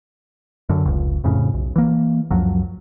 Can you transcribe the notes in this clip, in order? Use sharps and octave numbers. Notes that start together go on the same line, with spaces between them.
F#2 D3
F1 C#2
F2 A2 C#3
B1
E3 A#3
C#2 F#2 F3 F#3